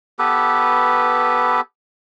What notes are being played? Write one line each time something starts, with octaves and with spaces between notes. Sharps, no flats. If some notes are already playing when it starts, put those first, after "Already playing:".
B3 G4 A4 B4